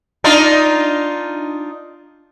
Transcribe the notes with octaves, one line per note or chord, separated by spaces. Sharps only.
D4 D#4 F4